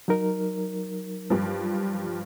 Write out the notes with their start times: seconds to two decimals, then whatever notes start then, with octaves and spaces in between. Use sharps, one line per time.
0.08 F#3 D#4 A#4
1.30 G2 F3